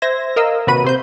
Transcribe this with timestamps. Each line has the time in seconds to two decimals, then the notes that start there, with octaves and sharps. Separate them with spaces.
0.02 C5 E5 G#6 A#6
0.36 A#4 D#5 F5 E6
0.67 D#2 C3 F#4 B4 B5 D#7
0.84 C3 C5 G6